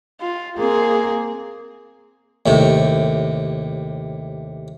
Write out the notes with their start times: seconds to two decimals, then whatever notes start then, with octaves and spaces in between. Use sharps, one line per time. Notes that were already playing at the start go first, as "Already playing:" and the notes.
0.21 F4
0.58 A#3 C4 G#4
2.46 D#2 A2 C3